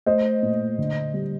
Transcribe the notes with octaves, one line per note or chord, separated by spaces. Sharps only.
A3 C5 D#5
A#2
D3
G3